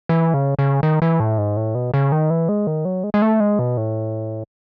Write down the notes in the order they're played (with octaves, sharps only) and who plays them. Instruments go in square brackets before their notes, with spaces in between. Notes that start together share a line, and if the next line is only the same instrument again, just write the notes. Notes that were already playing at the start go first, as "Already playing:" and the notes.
[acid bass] E3
C#3
C#3
D#3
E3
A2
G#2
A2
B2
C#3
D#3
E3
G#3
D#3
F#3
G#3
G#3
A3
G#3
B2
A2